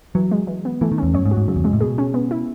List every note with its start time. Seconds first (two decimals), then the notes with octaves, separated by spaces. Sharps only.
0.15 E3 F#3
0.31 G#3
0.47 E3
0.65 B3
0.81 E3 A3
0.92 D#3
0.98 E2 C#4
1.14 F#2 C#5
1.25 G#2
1.31 F#4
1.37 G#2
1.48 F#2 C#3
1.56 E2
1.64 F#2 G#3
1.73 A2
1.81 B2 G#4
1.98 C#4
2.14 B3
2.31 E4